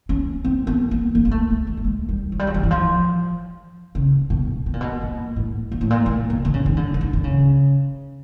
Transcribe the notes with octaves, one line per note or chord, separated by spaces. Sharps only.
C#4
C4
B3
A#3
A#3
A#3
A3
G#3
G3
A3
G#3
G3
F#3
G3
F#3
F3
E3
F3
C#3
B2
B2
A#2
B2
A#2
A2
A#2
A2
A#2
A#2
B2
D3
C#3
D#3
D3
D3
D#3
D3
C#3